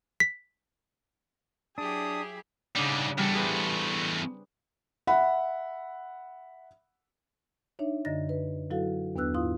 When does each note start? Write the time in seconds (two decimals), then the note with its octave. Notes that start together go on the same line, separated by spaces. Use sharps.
0.20 B6
1.78 F#3 D4 E4 G4 G#4 D#6
2.75 G#2 C#3 G3 D4
3.18 E2 G3 A3
3.35 G#4 B4 C5
5.07 E5 F#5 B5
7.79 D4 D#4 C#5 E5
8.05 F#2 D3 D#5 A6 A#6
8.29 B4
8.70 F#3 E4 F#4 A4 F5
9.16 D#2 B3 D4 B4 E6 F#6
9.34 G#2 E4 F4 F5 C6 D#6